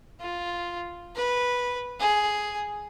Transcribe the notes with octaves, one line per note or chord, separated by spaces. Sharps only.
F4
B4
G#4